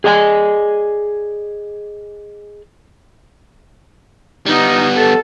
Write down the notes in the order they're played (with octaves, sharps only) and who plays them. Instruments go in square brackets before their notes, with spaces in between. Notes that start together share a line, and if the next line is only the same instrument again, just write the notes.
[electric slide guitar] G#4 D5 D#5 G5 G#5
[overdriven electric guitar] G3 B3 [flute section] D#4
[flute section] A4